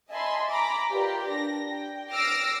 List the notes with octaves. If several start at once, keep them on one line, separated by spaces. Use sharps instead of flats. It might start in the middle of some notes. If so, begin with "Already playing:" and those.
D#5 E5 G#5 A5 B5 C6
A#5 B5 D6
F4 G4 A#4 B4 D5 G5
D4 A#6
G5
D6 E6 F6 A#6 C7 D7